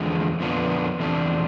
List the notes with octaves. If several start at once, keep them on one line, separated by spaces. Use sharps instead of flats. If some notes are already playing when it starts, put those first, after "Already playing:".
Already playing: E2 D3 F3 G#3
F2 D3 F3 B3 D4
E2 C3 F3 A3 D4